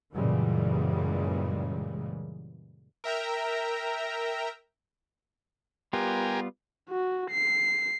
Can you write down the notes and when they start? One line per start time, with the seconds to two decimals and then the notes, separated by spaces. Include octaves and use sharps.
0.15 F#2 A#2 C#3 E3 G3 G#3
3.04 A#4 E5 G5 A#5
5.93 G3 B3 F4 G4 A#4 G#5
6.90 F#4
7.31 C7